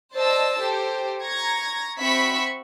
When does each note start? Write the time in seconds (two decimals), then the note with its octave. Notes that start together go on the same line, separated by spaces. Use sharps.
0.14 C5 D5 D#5 A5 E6
0.60 G4 A4 C5
1.23 A#5 C#6 G#6 A#6
1.99 C4 F#4 E5 B5 C#6 B6